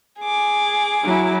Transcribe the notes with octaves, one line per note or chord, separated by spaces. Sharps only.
G#4 D6
F#3 E4